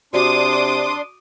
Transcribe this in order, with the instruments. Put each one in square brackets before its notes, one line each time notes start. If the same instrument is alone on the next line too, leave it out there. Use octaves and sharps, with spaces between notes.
[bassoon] C3 [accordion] D4 C6 [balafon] F#4 D5 [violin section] D6 D#6